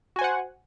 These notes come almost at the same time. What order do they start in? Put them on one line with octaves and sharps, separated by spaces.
F#4 G#5 C5 F#5